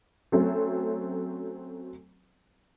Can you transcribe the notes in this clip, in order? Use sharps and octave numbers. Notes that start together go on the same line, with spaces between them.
F#3 A3 C4 C#4